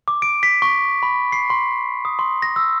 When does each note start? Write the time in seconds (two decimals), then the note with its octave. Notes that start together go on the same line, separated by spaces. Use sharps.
0.08 D6
0.22 D7
0.43 B6
0.62 C#6
1.03 B5
1.32 C7
1.50 C6
2.05 D#6
2.19 C6
2.42 A#6
2.56 E6